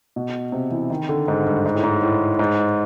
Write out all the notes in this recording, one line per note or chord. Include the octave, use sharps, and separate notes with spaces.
B2
C3
E3
D#3
D3
G#2
G2
G#2
A2
G#2
A2
G#2